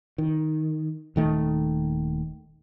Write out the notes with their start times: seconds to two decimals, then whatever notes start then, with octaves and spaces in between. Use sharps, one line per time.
0.18 D#3
1.16 D#1 D#3 A3